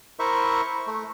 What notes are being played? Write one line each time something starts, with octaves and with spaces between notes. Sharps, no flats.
E4 A#4 C5 E5 C#6
A3